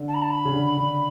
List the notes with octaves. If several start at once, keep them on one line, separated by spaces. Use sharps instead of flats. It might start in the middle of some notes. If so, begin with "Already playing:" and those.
Already playing: D3
A5
B5
A5
B5
C#3
D3
D3